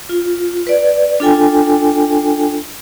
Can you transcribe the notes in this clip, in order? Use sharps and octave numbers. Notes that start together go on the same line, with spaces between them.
F4
B4 D5
D4 F4 A4 G5 G#5